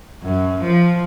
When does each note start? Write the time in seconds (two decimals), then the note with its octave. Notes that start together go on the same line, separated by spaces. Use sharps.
0.23 F#2
0.61 F3